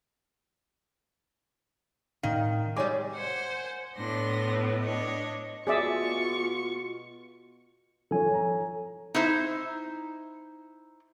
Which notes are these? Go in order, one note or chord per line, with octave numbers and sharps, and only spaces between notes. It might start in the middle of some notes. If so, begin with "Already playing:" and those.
A2 D#3 F5
G3 G#3 C#5 G#5 D6
C5 F#5 G#5
A2 B3 D4 C6 A#6
D4 C#5 D#5
B2 F4 G#4 D5 E5 C#6
F3 A4 C#5 G#5
C#5 A#5
D#4 E4 C5